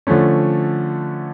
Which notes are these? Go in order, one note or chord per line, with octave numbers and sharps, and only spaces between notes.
D3 F3 A3 C#4